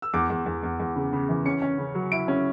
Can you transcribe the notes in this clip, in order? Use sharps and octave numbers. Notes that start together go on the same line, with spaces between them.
E6
E2 D6
E2
E2
E2
E2
C#3
C#3
E3
C#4 C#7
C#4
C#3
F#3
E4 D7
C#4